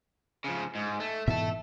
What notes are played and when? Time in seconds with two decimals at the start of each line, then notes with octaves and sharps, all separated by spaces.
0.44 C#3 F3
0.75 G#2
1.00 A3
1.27 G#2 B2 E3 E5 A5